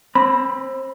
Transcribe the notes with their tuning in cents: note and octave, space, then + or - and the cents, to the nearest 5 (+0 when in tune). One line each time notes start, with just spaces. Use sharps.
C4 +25 B5 -5